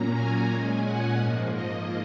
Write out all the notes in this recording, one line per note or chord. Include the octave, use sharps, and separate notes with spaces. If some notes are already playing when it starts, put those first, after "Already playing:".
Already playing: A#2 F#3 A#3 C#4 A#5
G#5
A#2 G#3 C#4 G#5
F#5
G#2 F3 A#3
D#5